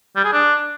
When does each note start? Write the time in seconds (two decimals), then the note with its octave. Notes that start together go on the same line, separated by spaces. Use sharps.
0.16 G3
0.25 G#4
0.33 D4